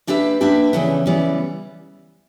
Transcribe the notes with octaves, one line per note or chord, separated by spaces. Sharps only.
A#3 D4 G4 B4 E5
A#3 D4 G4 B4 E5
C#3 E3 G3 B3
C#3 E3 G3 B3